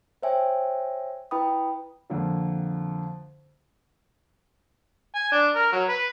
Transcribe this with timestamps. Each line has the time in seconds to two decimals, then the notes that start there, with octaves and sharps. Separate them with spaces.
0.22 C5 C#5 E5 G5 G#5
1.31 E4 B4 G5 B5 D#6
2.10 F2 D3 A#3 F4
5.15 G#5
5.32 D4
5.56 A#4
5.72 F#3
5.88 B4